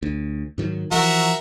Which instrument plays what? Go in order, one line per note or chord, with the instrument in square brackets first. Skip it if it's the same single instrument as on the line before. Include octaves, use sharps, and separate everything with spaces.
[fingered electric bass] D2
G#2 D#3 F#3
[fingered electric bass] E3 F3 [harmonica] F#4 A#4 E5